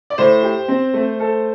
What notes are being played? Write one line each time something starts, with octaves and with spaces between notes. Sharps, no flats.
D5
A2 C5
G4
C4
A3
A4